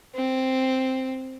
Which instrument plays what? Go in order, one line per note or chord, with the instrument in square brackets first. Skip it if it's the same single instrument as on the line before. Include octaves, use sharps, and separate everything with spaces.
[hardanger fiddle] C4